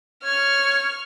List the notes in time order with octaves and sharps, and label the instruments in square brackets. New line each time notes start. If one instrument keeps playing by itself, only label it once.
[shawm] C#5 [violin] C#6 F6